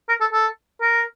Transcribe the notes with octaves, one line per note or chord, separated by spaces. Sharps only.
A#4
A4
A4
A#4